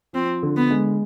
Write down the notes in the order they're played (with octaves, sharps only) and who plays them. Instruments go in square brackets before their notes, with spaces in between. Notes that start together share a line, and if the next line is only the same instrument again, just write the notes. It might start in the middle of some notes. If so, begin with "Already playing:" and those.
[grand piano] F3 [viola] C4
[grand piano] D3
[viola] B3
[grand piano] G#3